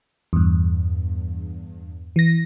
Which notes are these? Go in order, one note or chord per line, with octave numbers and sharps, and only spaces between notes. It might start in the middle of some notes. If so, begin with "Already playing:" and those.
E2 G2
E3 A#6